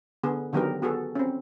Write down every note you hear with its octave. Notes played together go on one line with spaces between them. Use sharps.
D3 B3 G#4
D3 D#3 F#3 B3 G4 A#4
B3 F#4 G#4 A4
C4 C#4